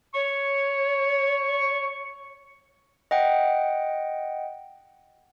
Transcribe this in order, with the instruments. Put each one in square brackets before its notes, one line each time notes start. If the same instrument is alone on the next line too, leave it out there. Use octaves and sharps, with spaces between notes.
[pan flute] C#5 [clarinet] C#6
[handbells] D#5 F#5 G5